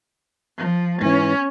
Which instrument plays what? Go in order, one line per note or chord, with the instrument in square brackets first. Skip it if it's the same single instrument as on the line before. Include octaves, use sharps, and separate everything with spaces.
[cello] F3
[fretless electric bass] G#2 E3 [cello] C#4